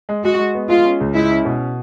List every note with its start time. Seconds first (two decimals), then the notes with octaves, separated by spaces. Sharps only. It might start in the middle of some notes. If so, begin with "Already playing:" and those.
0.09 G#3
0.24 G#3 F#4
0.39 G#3
0.55 B3
0.69 G#3 F4
0.85 C#4
1.00 C#2
1.14 G#3 E4
1.30 C#4
1.45 B2